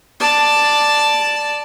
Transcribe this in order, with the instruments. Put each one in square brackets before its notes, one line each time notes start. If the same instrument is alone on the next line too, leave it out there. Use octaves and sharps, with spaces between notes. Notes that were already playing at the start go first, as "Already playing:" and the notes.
[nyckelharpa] D5 A5